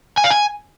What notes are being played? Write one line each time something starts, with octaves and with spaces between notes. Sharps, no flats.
G#5
F5
G#5